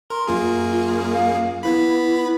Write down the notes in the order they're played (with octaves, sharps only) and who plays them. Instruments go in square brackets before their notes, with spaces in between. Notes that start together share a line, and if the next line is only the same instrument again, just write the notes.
[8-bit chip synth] A#4 [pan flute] C6
[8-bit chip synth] F#2 A#3 G#4 [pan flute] F4
[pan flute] F4
F5
[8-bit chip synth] B3 B4 B5 [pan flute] E4